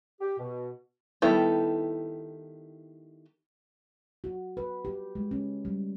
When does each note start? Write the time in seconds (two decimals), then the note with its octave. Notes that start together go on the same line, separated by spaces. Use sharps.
0.21 G4
0.39 B2
1.22 D#3 G3 B3 E4 A4
4.24 F#4
4.57 B4
4.85 G4
5.15 G#3
5.31 C#4
5.65 G3